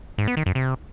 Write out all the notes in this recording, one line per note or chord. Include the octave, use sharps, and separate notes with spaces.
G#2
B3
D#3
F#2
C3